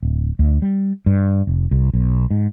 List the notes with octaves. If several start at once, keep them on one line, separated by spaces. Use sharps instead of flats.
D1
D2
G3
G2
F1
C2
B1
G#2